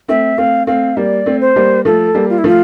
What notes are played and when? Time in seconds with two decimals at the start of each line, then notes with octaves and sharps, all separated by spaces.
0.08 A3 C4 E5
0.38 A3 C4 F5
0.67 A3 C4 F5
0.97 G3 A#3 D5
1.26 A3 C4
1.41 C5
1.56 G3 A#3
1.85 F3 A3 A4
2.15 G3 A#3
2.30 F4
2.38 E4
2.44 F3 A3 F4